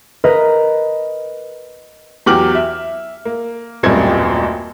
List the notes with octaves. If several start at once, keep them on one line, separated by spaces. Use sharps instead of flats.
A#4 B4 D#5
E2 F#3 G4 D6 F6 F#7
E5
A#3
D#1 A1 F#2 G3 C4 G#6